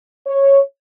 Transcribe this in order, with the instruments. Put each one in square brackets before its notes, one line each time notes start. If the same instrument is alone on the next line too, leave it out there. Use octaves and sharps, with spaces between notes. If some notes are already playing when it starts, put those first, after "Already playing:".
[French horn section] C#5